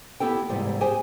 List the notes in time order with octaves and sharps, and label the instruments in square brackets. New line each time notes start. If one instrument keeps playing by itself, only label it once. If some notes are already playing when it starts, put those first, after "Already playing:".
[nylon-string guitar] B3 E4 G4 A4 G5
E2 G#2 C3 G3
G4 G#4 C5 G5 G#5